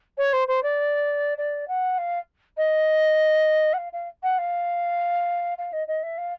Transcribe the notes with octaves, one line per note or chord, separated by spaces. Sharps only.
C#5
C5
C5
D5
D5
F#5
F5
D#5
F#5
F5
F5
F#5
F5
F5
D#5
D#5
E5
F5